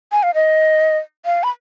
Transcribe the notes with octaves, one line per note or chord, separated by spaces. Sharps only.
G#5
F5
D#5
F5
B5